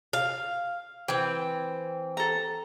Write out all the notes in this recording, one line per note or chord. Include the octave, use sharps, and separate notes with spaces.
F5
E3 C4 G5
A4 A#5